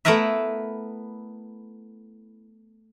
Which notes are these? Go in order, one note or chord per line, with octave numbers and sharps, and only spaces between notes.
A3 B3 E4 A#4 B4 E5